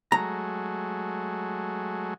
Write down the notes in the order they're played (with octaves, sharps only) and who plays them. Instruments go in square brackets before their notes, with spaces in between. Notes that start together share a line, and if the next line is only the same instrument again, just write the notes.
[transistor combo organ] F#3 G#3 A3 [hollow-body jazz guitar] A#5